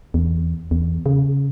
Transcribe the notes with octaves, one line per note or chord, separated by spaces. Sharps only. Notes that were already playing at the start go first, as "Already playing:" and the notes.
E2
E2
C#3